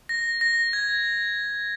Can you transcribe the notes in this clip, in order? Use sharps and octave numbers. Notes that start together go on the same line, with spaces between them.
A#6
A#6
G#6